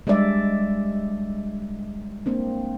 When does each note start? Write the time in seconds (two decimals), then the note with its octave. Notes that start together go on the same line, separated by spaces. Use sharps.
0.07 G3 G#3 D4 D5 E5
2.26 A#3 C4 D4